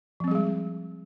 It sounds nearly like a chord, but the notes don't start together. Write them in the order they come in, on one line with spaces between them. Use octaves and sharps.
F3 C4 G3 G#4 G#3